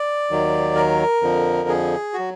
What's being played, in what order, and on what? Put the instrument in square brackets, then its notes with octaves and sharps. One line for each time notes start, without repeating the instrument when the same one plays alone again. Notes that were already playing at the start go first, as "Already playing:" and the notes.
Already playing: [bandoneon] D5
D#2 D#3 F#3
A#4
F2 D3 F3
G#4
F#4
F#3